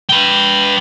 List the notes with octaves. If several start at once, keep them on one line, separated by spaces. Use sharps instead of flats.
B4 G5